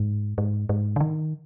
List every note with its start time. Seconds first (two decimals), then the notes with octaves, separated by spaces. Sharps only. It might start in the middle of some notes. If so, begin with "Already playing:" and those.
Already playing: G#2
0.38 G#2
0.69 G#2
0.96 D3
1.00 D#3